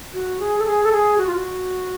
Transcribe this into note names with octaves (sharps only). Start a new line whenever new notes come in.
F#4
G#4
A4
G#4
A4
G#4
F#4
F4
F#4